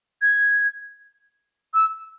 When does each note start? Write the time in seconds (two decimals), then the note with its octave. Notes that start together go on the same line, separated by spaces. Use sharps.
0.22 G#6
1.74 E6